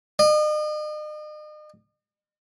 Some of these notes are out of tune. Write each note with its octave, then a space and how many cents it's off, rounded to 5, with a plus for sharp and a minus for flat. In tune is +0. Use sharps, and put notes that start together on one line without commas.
D#5 -40